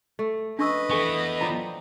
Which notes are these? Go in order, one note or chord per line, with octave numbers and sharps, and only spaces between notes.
A3
D4 B4 D#5 C#6 E6
E3 B3 A4 G#5 C#6
F3 D5 G5 A#5 B5